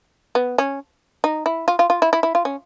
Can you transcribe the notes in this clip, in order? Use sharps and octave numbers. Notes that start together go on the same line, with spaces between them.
B3
C#4
D#4
E4
F4
F4
F4
E4
E4
E4
F4
C#4